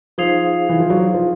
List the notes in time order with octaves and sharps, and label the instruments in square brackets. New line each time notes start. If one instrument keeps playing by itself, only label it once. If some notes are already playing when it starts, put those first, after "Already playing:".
[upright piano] F3 [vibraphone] D#4 G#4 C5 F5
[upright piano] E3
F3
F#3
F3